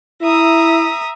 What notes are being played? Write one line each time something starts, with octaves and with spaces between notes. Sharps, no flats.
E4 E5 A#5 D#6